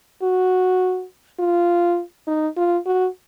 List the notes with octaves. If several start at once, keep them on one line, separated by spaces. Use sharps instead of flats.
F#4
F4
D#4
F4
F#4